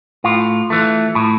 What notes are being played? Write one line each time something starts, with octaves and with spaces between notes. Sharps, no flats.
A2 F4
E3 A3
A2